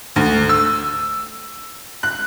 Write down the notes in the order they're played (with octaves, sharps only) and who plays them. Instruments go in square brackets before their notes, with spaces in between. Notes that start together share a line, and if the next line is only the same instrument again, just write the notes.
[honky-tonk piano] D2
E6
F#6